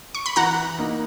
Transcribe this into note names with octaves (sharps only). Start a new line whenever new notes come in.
C#6
B5
E3 F#5 A#5
A#3 D#4